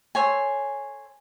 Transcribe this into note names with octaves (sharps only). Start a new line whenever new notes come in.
A4 C5 C#5 G#5